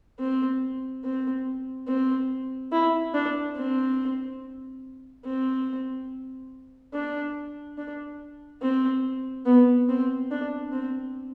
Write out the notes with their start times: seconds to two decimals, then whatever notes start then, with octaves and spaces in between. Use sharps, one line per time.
0.19 C4
1.04 C4
1.87 C4
2.72 E4
3.14 D4
3.56 C4
5.25 C4
6.93 D4
7.78 D4
8.62 C4
9.45 B3
9.89 C4
10.31 D4
10.72 C4